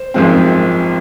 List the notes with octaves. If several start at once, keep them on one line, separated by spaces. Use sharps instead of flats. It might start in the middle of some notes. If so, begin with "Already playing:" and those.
Already playing: C5
G#1 F#2 F3 G#3 C4